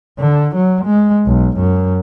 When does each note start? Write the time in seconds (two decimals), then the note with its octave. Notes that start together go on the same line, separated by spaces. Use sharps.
0.19 D3
0.55 F#3
0.85 G#3
1.26 B1
1.58 F#2